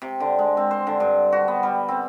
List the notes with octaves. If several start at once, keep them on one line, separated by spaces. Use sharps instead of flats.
C3
D3
G#3
C4
C5
D3
G2
F#4
B3
G3
C4